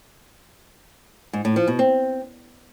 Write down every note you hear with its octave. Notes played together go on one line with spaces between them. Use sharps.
G#2
A2
F3
B2
C4